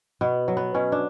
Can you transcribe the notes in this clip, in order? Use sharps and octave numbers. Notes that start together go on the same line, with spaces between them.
B2 B3
F#3
B3
B2 C#4
D4